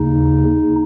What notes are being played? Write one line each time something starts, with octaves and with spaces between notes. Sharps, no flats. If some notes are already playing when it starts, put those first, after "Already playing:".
Already playing: D#2 C#3 D#4